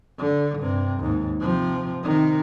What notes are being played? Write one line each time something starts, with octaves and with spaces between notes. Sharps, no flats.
D3
G2 C3
D#2 G#2
C3 F3
C3 D#3